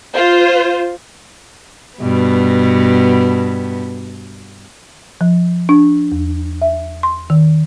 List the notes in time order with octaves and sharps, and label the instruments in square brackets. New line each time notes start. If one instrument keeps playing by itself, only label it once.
[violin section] F4 C5
[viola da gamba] G2 B2 B3
[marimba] F3
D4
E2
E5
C6
D#3